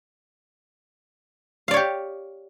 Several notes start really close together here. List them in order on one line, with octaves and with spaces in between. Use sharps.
F5 D5 C#5 G4